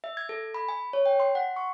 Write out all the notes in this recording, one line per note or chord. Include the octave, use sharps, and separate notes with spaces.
E5
G#6
A4
B5
G#5
C#5
G5
C6
F#5
C#6